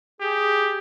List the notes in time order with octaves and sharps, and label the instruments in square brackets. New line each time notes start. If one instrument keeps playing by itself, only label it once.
[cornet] G4 [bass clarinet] G#4